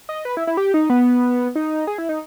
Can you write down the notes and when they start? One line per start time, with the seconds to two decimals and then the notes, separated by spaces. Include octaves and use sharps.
0.09 D#5
0.25 B4
0.37 E4
0.47 E4
0.57 G4
0.74 D#4
0.90 B3
1.55 D#4
1.87 G#4
1.98 E4
2.09 D#4